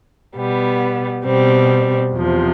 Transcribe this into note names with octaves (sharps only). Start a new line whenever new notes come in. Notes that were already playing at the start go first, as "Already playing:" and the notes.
B2 G3 B3
B2 G3 C4
E2 C3 F3